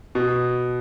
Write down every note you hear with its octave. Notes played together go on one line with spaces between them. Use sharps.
B2